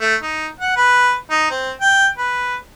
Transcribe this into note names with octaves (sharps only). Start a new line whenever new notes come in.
A3
D#4
F#5
B4
D#4
C4
G5
B4